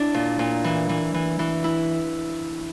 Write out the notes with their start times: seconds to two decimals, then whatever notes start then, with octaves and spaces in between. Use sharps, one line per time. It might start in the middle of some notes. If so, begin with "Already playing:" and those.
Already playing: D4 E4
0.14 A#2
0.39 A#2
0.64 E3
0.89 E3
1.14 E3
1.39 E3
1.64 E4